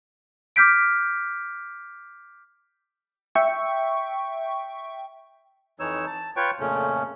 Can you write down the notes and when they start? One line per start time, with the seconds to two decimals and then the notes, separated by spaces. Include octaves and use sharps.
0.56 D6 F6 G6 B6 D7
3.35 E5 G5 C#6
5.80 F2 E3 D#4 C#5 E6
6.07 A5
6.36 F4 B4 C#5 G5 C#6
6.60 F2 A#2 C#3 A3 C#4